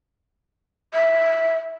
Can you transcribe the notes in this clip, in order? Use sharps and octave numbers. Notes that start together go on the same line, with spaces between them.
E5